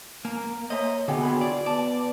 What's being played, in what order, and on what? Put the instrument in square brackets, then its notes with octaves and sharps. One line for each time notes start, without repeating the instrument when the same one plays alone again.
[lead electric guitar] A#3 [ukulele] A#5
[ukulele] C5 E5 A#5 [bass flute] C#5 [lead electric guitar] D#5
[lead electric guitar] D3 B3 [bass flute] F#4 [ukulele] G#4 F#5 G5
[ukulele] F4 G#4 B5
[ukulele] E4 [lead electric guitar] D5
[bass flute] B3 [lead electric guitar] D5 [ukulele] A5